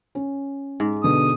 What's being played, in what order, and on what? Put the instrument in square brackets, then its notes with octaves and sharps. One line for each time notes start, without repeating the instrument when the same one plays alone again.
[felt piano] C#4
[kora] G#2
[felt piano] B2 D3 [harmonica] D#6